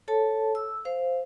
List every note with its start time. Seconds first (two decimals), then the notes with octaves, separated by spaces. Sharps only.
0.08 A4 C#5 A5
0.55 E6
0.85 C5 F5